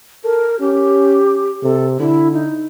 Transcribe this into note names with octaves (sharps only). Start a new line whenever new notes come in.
A4 A#4
C#4 G4
C3 A4
D3 E4
D#4